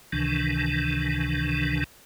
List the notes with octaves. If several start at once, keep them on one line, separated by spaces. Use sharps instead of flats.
C#2 C3 D#3 E3 D4